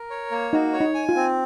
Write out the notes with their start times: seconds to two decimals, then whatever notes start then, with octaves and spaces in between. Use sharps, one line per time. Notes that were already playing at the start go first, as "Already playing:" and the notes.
Already playing: A#4
0.10 C#5
0.31 A#3
0.53 D#4 F#4
0.73 C#5
0.81 D#4
0.94 G#5
1.09 F4
1.16 C4